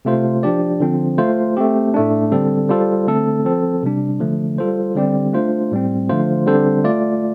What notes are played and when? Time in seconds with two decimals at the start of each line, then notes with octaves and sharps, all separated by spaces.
0.05 C3 A3 F4 C5
0.43 F3 D4 G4 D5
0.80 D3 F3 C4
1.18 A3 F4 C5
1.57 A3 C4 G4
1.94 A2 A3 D4
2.32 D3 G3 C4 A4
2.69 G3 F4 A4 C5
3.07 D3 A3 C4 A4
3.45 F3 C4 A4 C5
3.83 C3 G3 D4
4.20 D3 F3 A3
4.58 G3 F4 A4 C5
4.95 D3 G3 C4 G4 D5
5.33 A3 D4 F4 C5
5.72 A2 G3 C4
6.09 D3 F3 A3 F4 C5
6.46 D3 G3 C4 A4 C5
6.84 A3 F4 D5